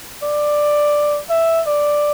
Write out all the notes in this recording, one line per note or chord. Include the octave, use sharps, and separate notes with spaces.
D5
E5
D5